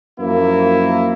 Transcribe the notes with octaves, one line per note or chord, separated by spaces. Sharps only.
F#2 F3 A#3 E4